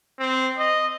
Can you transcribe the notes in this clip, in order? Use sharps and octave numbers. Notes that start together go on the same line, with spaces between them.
C4
D#5